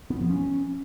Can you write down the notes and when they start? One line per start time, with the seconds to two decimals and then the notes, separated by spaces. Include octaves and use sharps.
0.10 B3
0.20 F3
0.30 C#4